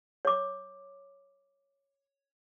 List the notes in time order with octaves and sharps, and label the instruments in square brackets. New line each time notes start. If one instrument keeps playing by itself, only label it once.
[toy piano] C#5 D6